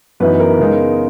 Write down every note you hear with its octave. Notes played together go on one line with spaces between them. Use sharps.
F#2 E3 B3 D#4 B4
A#4
C#3 G#3 B3 D#4